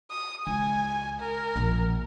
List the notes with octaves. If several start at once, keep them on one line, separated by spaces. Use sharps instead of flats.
D#6
C#2 G#5
A#4
A#1 A#3